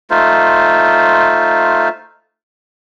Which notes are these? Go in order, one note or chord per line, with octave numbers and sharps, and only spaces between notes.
A3 D#4 F4 C5